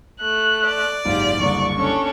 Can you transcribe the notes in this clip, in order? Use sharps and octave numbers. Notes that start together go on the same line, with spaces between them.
A3 F#6
D5
F#1 G#2 F4 G4
F#1 C2 D3 C#6
C#4 D4 A4